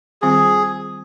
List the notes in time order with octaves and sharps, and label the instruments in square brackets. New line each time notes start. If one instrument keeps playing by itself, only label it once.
[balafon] D#3 G3 C4 F4 [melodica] G#4